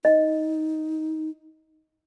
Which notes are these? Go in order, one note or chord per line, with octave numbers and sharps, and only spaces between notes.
D#4 D#5